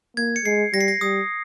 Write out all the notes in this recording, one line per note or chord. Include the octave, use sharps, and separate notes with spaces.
A#3 G#6
C#7
G#3 C7
G3 A#6
C7
A#6
G3 D#6